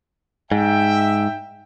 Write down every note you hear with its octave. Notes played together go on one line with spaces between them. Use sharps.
G#2 E5 G5